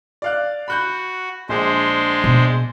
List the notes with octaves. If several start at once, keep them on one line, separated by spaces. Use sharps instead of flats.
D5 F5 F#6
F#4 B5 F#6 G6
A#1 G#3 D4 G#4 C5
B2